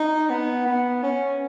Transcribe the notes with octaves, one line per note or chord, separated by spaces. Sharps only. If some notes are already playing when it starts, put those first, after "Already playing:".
Already playing: D#4
B3
B3
C#4